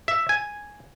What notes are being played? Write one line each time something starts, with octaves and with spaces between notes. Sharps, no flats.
E5
G#5